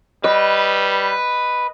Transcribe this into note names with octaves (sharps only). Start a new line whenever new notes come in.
G3 B4 D#5